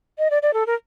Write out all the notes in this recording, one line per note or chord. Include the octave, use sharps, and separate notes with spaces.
D#5
D5
D5
A4
A#4